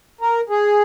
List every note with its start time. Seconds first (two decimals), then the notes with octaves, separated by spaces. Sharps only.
0.21 A#4
0.50 G#4